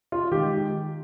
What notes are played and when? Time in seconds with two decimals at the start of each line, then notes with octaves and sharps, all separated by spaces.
0.12 F4
0.31 D#3 G#3 G4